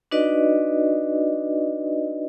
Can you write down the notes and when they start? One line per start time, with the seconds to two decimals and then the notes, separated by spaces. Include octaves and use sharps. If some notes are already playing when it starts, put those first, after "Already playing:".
0.11 D4 D#4 F#4 B4 D5 D#5